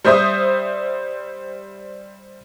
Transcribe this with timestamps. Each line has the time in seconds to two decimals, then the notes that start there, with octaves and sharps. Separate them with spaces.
0.04 G3 C5 E5 D#6